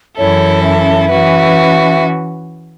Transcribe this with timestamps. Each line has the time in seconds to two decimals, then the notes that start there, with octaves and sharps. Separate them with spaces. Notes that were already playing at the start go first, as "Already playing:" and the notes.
0.17 F#2 E3 C#4 E4 A4 C#5
0.63 E5
1.09 E3 C#4 F#4 B4